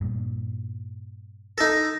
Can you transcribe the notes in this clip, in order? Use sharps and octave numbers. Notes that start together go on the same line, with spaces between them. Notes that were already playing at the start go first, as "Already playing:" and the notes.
G2 A#2
D#4 A4 A#6